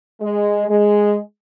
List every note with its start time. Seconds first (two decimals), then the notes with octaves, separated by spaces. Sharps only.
0.21 G#3
0.68 G#3